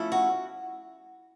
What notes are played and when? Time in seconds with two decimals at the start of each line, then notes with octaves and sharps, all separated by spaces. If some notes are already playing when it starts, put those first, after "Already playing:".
Already playing: F3 A3 C#4 E4
0.12 F#4